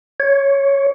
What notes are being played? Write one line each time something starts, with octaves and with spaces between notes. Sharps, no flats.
C#5